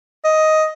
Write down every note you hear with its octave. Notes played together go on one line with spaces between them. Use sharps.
D#5